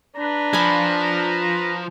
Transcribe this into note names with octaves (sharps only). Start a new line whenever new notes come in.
D4 B4 A#5
F3 G#5 B5